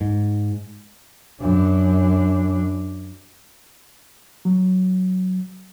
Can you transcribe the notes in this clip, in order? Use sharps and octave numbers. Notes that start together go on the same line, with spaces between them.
G#2
F#2 D4
F#3